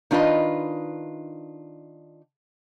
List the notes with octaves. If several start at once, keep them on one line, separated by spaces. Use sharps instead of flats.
D#3 D4 F4 B4 D#5